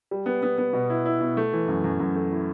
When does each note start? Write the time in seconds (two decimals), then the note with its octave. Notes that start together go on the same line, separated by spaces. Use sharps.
0.11 G3
0.26 B3
0.43 B3
0.58 B3
0.73 B2
0.90 E4
1.06 E4
1.21 B2
1.37 A3
1.53 E3
1.68 F#2
1.84 F#2
2.00 F#2
2.15 A3
2.32 E4